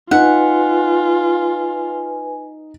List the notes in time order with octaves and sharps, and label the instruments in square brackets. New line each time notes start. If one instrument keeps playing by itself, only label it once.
[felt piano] D#4 [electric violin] F4 [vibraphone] B4 G#5 [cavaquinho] F#5